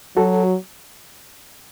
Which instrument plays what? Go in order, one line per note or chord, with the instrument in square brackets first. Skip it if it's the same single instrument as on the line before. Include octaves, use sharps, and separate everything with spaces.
[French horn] F#3 [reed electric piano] F#4 A4